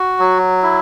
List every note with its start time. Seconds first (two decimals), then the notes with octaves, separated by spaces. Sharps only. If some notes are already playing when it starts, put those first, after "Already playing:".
Already playing: F#4
0.19 F#3
0.62 E4